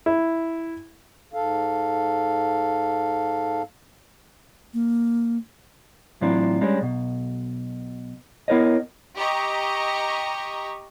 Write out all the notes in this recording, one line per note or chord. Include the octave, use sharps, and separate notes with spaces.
E4
G#2 A4 F5
A#3
A2 E3 F#3 C4 D4 F4
G3 G#3 C#4 D4
B1 B2
B3 E4 A#4 C#5 D#5
G4 D#5 A#5 C#6